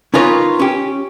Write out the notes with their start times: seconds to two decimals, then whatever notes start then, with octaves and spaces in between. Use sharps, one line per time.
0.14 C#4 D#4 F4 A#4 B4 C#5
0.59 C#4 G4